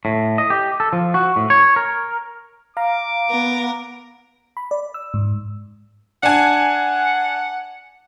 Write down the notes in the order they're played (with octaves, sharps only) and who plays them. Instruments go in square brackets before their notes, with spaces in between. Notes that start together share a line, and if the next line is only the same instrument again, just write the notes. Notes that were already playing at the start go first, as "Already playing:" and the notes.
[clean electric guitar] A2
D#5
G4
A4
F3
F#4
A2
C#5
A#4
[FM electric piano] F5 A#5 [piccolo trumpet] D6
[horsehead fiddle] B3 [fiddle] A#4
[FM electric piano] B5
D5
E6
G#2
[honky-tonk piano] D4 G#5 [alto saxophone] F#5